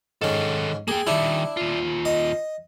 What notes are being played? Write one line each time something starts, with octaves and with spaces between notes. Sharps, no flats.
G#2 D#3 C#4 A4
A#3 G#4 G5
D#3 G3 D4 E4
D#2 F4
D#5